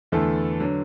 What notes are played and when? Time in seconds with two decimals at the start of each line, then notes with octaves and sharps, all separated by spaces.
0.12 E2 D3 A3 E4 A4
0.60 D3 F#3